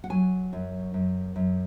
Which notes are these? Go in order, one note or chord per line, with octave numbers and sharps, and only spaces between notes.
F#5
F#3 G#5
F#2
F#2
F#2